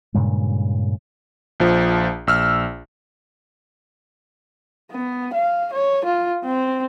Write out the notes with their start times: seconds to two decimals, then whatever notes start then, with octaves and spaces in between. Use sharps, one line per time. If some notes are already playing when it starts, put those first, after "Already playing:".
0.14 G2 A#2 C#3 G#3
1.60 A#1 F3
2.27 A#1 E6 F6
4.91 B3
5.34 F5
5.73 C#5
6.05 F4
6.44 C4